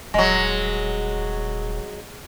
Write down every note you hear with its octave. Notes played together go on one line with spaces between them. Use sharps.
D#1 F#3 G#3